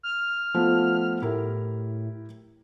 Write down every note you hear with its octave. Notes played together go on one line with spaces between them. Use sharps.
F6
F3 A3 B3
A2 E4 G4 A#4